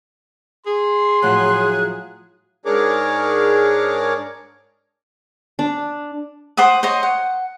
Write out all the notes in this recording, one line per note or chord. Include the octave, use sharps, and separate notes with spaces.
G#4 C6
A2 F3 F#3 F#6
G#2 D4 G#4 A#4 C#5 D6
D4
C5 F#5 D6 D#6
C5 C#5 D#5
F#5